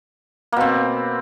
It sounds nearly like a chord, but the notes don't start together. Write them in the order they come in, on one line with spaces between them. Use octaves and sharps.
A#3 B2 C4